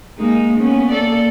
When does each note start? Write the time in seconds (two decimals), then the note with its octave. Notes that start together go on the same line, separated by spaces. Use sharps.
0.18 G#3 A#3 D#4
0.58 A#3 B3 C#4
0.91 A#3 A4 D5